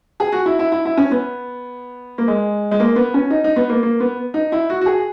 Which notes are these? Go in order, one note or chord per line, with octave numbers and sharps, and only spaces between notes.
G#4
F#4
E4
E4
E4
E4
C#4
B3
A#3
G#3
G#3
A#3
B3
C#4
D#4
D#4
B3
A#3
A#3
B3
D#4
E4
F#4
F#4
G#4